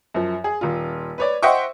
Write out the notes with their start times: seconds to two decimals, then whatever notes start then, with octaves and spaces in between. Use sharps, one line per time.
0.14 F#2 F3
0.44 G#4
0.61 D#1 F4
1.18 B4 C#5 D5
1.42 C5 D#5 E5 F#5 G5 C#6